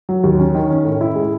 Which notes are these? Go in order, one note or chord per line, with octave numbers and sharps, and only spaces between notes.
F#3
D#2
C#4
D#3
C#4
A2
E4
G#3